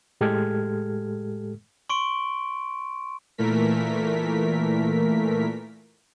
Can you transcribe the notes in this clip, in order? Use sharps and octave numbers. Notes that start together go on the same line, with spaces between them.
A2 G#3 G4 A4 F6 G#6
C6 C#6 D7
A#2 E3 A3 A#4 B6